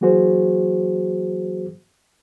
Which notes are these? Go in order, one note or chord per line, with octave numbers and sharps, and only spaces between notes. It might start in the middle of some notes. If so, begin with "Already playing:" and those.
E3 F#3 A#3 F#4 G#4 C5